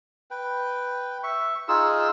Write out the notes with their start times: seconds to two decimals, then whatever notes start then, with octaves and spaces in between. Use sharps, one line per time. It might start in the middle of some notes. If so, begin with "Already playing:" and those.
0.31 B4 G5
1.23 E5 C#6
1.68 D#4 F4 G#4 E6